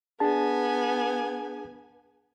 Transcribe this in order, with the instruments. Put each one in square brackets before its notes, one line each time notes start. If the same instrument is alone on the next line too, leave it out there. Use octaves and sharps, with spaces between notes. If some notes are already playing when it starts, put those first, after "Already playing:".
[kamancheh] B3 G#5 [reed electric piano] D4 G#4 A5